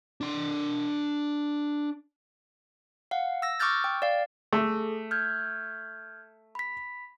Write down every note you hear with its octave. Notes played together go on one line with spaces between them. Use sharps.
D4 C6
F5 F#5
E6 A#6
C#6 D6 E6 F6 G6 A6
G5
D5 F5
A3 G#4 A4
F6 G6 G#6
B5 B6